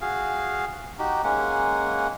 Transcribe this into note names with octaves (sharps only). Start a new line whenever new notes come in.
F#4 G#4 F5
D#4 F#4 G4
G#3 A#3 C#4 F#5